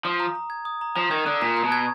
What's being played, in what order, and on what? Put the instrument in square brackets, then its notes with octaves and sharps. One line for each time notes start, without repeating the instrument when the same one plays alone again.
[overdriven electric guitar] F3 [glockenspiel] D#6
[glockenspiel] A#5
A#5
G#6
D#6
A#5
[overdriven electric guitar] F3 [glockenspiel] A#5
[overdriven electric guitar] D#3 [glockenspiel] G#6
[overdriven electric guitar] D3 [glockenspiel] D#6
[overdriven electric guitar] A#2 [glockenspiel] A#5
[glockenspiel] A#5
[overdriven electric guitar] B2
[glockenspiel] G#6